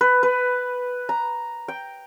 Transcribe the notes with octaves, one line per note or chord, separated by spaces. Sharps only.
B4
B4
A#5
G5